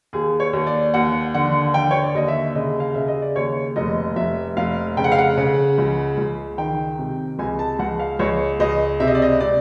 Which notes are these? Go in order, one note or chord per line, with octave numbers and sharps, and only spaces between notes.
D#2 G#4
C#5
D#2
D5
D#2 F#5
D3 F#5
D3 G5
C#5
D5
D#2 D#5
E5
C#3 D#5
F5
C#3 E5
D#5
D5
D#2 C#5
F1 D#5
F1 E5
F1 F5
C#3 G5
F#5
F5
F#5
C#3
C#2
C#2
D#3 G5
C3
C#2 G#5
A5
C#2 F#5
F5
C#2 C#5
C#2 D#5
C3 E5
D#5
D5
D#5
C3 D5